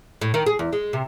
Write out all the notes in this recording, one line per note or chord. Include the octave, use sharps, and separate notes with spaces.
A2
D#3
G#4
E2
G#3
C3